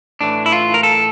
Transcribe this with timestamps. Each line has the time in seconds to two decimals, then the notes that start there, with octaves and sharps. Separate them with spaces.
0.21 A2 E3 D4
0.46 E4
0.52 F4
0.74 A#4
0.83 A4